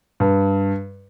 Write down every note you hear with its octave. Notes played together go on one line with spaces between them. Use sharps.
G2